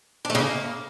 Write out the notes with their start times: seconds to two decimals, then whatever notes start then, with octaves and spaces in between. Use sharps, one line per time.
0.25 D4
0.30 A3
0.35 C#3
0.40 A#3